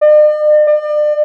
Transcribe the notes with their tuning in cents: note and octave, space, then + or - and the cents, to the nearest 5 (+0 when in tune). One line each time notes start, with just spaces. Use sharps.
D5 +45
D5 +40